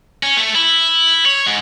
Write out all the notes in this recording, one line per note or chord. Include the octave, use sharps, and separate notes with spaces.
C#4
A3
E4
C#5
G#2